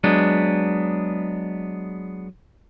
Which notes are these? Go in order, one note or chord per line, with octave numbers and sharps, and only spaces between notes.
F#3 G#3 B3 D4